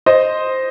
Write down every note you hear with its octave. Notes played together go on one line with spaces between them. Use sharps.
C5 D#5